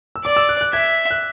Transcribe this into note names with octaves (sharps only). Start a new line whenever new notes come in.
E6
D5 D6
E6
F#6
F#6
E5 G#6
F#6